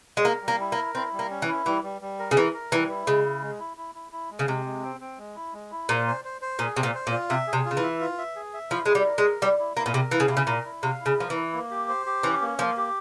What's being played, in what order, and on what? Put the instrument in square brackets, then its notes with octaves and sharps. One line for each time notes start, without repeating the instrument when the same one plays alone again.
[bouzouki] G#3
[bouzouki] A#3 [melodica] A#4
[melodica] G3
[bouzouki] A#3
[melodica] E4
[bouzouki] A#3
[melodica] A#4
[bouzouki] C4 [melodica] E4
[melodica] G3
[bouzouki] A#3
[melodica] C#4
[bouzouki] E3
[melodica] E4
[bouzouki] E3 [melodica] G3
[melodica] G3
G3
A#4
[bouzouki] C#3
[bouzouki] E3 [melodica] A#4
[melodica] A#4
[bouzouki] E3 [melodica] G3
[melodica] E4
[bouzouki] C#3 [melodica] G#3
[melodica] E4
G#3
E4
E4
E4
E4
G#3
[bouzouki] C#3
[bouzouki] C3 [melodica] G#3
[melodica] G#3
C4
C4
G#3
E4
G#3
E4
[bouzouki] A#2 [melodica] C5
[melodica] C5
C5
C5
[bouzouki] A#2 [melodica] G#4
[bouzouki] C3 [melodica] C5
[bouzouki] A#2
[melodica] C5
[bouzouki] A#2
[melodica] F4
[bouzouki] C3 [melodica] E5
[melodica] G#4
[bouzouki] C3
[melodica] F4
[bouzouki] C#3
E3
[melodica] E5
F4
E5
G#4
E5
[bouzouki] F3 [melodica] E4
[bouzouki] G#3 [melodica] E4
[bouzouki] G3
[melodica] A#4
[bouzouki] G#3
[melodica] A#4
[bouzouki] G3 [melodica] E4
[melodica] E4
[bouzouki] A#3 [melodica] E4
[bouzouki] A#2
[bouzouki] C3 [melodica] A#4
[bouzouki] E3 [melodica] F5
[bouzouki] C#3
[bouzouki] C3 [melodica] E4
[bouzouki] C#3
[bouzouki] A#2 [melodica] A#4
[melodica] E4
[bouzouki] C3 [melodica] F5
[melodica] E4
[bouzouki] C#3
[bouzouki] F3 [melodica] A#4
[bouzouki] E3
[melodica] E4
A#3
G4
C5
G4
[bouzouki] E3 [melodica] C#4
[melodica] A#3
[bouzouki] F3 [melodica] A#3
[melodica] G4